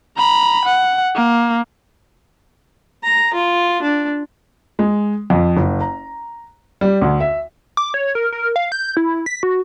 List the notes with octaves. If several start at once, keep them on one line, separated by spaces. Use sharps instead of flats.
A#5 B5
F#5
A#3
A#5
F4
D4
G#3
F2
F#1
A#5
G3
D2
E5
D6
C#5
A#4
A#4
F5
G6
E4
B6
F#4